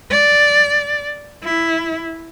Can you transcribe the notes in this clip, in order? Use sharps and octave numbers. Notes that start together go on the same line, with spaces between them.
D5
E4